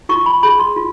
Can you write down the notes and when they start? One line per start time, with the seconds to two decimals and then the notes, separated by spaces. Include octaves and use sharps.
0.09 F4 C#6
0.26 B5
0.43 G#4 B5
0.59 C6
0.76 F4